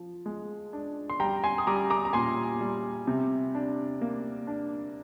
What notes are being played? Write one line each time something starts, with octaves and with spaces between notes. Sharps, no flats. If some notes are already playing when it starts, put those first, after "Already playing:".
Already playing: F3
G#3
D4
C6
G3 G5 A#5
G#5 C6
D#6
G3 A#5 D6
A#5 D6
A#5
A#2 G#5 C6
G3
C3
D4
A#3
D4